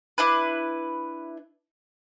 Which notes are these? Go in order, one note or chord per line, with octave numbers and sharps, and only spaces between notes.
D4 E4 B4